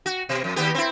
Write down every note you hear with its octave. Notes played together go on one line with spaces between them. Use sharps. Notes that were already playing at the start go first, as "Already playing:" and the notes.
F#4
B2
F2
D#2 B3 G4
C4 E4